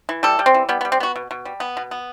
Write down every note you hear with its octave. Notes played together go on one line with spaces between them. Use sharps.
E3
G3 A4
G3
C4
E3
G3 B3
B3
G3
C4
B3 F#4
B2
B2
G3
B3
B2
B3